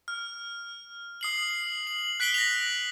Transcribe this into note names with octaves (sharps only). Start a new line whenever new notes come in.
F6
D#6 C7 F#7
F#7
F#6 B6 D7 F#7 G7
A#6 F7